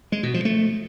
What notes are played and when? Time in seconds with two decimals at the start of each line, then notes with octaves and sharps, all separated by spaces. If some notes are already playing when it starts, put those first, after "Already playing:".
0.12 G#3
0.23 B2
0.34 F3
0.45 A3